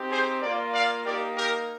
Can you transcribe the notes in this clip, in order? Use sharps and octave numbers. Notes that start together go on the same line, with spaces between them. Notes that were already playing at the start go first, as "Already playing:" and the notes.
Already playing: C4 D#4 G4
G#4 C5
A#3 F4 A#4 D5
D5 F5
A#3 D#4 G4 A#4 D5
G4 A#4